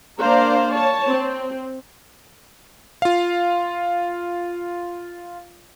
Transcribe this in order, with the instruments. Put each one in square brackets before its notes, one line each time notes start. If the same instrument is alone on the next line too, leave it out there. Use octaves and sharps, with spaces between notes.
[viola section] A#3 D4 C5 D5 F5 A#5
C#5 A5
C4
[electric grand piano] F4 F5